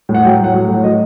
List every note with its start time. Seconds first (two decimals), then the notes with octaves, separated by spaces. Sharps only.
0.09 A2
0.15 F#5
0.24 F#3 G5
0.39 A2
0.44 F#5
0.54 F#3
0.68 A2
0.83 F#3 D#5